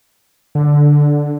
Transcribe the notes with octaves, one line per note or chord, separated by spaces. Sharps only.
D3